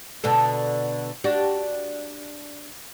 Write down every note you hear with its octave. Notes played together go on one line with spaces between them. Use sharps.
B2 D3 A4
D4 F#4 G4